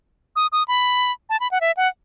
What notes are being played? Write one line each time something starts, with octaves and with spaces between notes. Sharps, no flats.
D#6
D#6
B5
A5
B5
F#5
E5
F#5